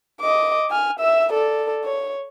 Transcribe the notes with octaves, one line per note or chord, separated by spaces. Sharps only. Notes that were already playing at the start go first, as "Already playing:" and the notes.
D#5 D6
G#5 F6
E5 E6
A4 D5
C#5